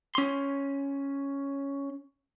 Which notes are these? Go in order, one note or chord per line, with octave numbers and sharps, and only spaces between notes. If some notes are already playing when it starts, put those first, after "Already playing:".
C#4 C6